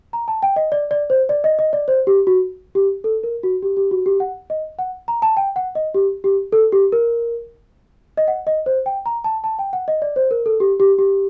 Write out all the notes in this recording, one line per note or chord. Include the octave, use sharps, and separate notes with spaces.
A#5
A5
G5
D#5
D5
D5
C5
D5
D#5
D#5
D5
C5
G4
F#4
G4
A4
A#4
F#4
G4
G4
F#4
G4
F#5
D#5
F#5
A#5
A5
G5
F#5
D#5
G4
G4
A4
G4
A#4
D#5
F#5
D#5
C5
G5
A#5
A5
A5
G5
F#5
D#5
D5
C5
A#4
A4
G4
G4
G4